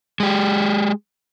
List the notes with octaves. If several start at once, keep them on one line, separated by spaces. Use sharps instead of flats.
G#3 G4